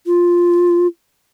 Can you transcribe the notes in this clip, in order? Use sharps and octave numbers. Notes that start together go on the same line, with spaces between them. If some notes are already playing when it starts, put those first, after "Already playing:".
F4